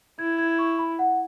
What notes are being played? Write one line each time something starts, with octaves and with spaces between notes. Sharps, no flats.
E4 G#6
G#6
C#6
B5
F#5